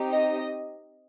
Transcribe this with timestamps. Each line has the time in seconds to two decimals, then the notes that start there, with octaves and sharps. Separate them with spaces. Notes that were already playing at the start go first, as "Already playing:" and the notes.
Already playing: C4 D#4 G4
0.10 D#5